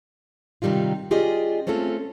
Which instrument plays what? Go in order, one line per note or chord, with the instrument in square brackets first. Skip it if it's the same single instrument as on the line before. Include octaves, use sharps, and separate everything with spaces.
[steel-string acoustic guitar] C3 D#3 G3 D#4 F4
C#4 F4 G4 G#4 D5 D#5
A3 C4 C#4 F4 A4